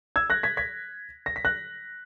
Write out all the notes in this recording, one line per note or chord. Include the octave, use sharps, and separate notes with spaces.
E6 G#6
F#6 A#6
G#6 B6
G#6 B6
A#6
B6
F#6 A#6